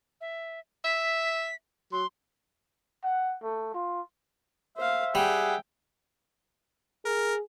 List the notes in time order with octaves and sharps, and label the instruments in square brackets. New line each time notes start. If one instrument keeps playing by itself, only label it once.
[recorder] E5
[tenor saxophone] E5 [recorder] B6
[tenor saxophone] F#3 [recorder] C6
[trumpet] F#5
A3
F4
[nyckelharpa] C5 F5 [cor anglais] E5
[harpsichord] G3 [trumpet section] G#4 F#5 [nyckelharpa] G5
[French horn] G#4 [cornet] A#4